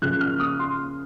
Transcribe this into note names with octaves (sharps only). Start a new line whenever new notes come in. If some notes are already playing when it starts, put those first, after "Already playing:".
C#3 F3 A#3 F#6
F6
D#6
C6